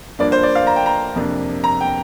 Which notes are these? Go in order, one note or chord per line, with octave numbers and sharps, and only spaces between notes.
G2 F3 A#3 D4 D5
C5
D5
F5
A#5
G5
A#5
F2 C3 A#3 D4
A#5
G5